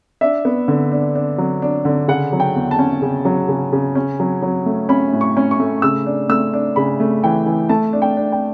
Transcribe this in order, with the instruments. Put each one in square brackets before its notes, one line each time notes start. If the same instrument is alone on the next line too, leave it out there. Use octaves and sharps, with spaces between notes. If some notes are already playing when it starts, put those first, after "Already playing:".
[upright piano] D4 E5
B3
D3
D4
D4
F#3
D4
D3
C#3 F#5
F#3
G5
E2
A5
C#4
C#3
F#3
C#3
C#3
C#4
F#3
F#3
A3
C#4 B5
A2
C#6
C#4
C#6
A3
C#3 E6
D4
A3 E6
D4
C#3 B5
A3
E3 G5
E3
A3 A5
D4
G5
D4
G5